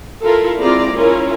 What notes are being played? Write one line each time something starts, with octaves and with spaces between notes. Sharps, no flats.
E4 F4 A4 A#4
G#3 C4 E4 F4 D5 A#5
C#4 E4 F4 A#4